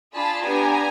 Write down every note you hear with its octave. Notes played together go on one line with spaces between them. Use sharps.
D4 F4 G#4 A5 B5
B3 D4 G4 G#5 A#5